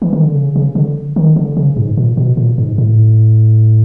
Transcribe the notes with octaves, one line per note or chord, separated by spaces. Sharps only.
E3
D#3
D3
C#3
C#3
D3
D#3
D3
C#3
G#2
A#2
B2
A#2
G#2
A2